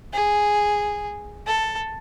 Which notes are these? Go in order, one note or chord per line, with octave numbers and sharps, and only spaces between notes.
G#4
A4